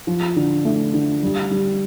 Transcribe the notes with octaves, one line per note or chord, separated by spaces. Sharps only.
F3
D3
A3
D3
G3
G3